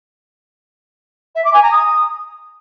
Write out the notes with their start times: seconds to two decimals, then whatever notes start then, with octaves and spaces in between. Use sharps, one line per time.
1.35 E5
1.44 D6
1.53 G#5
1.63 A#5
1.72 D#6